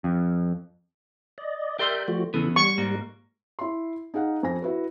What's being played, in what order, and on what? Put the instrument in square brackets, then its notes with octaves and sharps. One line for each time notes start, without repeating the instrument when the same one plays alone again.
[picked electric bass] F2
[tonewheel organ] D5 D#5
[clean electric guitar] G4 D5 C6 [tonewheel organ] A#4 E5 G6
[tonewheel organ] F3 A3 F#4
[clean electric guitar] E2 B3 [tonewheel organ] C#3 E3 A4
[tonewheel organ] G3 [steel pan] C#6
[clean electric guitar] G#2 A#3
[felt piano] E4 C6
D#4 G#4 F5 F#5
F2 G#5 A#6
E4 F#4 B4